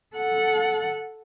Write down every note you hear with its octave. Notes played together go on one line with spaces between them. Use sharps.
A4 F#5